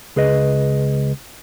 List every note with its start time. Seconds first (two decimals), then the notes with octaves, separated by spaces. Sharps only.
0.16 C#2 G#4 B4 D#5